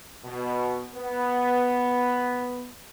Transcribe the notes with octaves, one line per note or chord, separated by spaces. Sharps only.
B2
B3